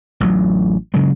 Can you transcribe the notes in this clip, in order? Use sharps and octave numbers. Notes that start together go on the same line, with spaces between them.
A1 F#3
C#3 F#3 G#3